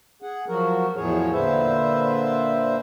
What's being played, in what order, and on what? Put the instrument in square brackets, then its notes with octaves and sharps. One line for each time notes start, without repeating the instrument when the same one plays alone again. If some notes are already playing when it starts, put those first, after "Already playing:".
[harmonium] G#4 F#5
F3 F#3 F#4 A#4
E2 A2 F3 F#3 G#4 C#5
A#2 D3 B4 C5 E5